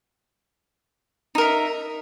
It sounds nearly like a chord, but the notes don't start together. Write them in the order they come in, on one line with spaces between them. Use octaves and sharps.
D#4 A#4 E5